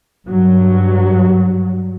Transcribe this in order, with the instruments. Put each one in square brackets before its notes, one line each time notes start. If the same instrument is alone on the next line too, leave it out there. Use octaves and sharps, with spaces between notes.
[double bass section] G2 F#3